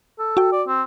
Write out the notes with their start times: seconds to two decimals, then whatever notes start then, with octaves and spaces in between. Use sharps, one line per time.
0.19 A4
0.37 F#4 G5
0.52 D5
0.68 C4